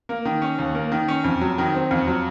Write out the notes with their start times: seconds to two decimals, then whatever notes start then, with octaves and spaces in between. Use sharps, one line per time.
0.09 A#3
0.25 D#3
0.42 C#4
0.58 D#2
0.75 A#3
0.92 D#3
1.08 C#4
1.24 F2
1.41 F#3
1.58 D#3
1.75 C4
1.91 F2
2.07 F#3